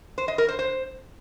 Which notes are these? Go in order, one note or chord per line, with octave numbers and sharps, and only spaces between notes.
C5
D#5
A#4
C5
C5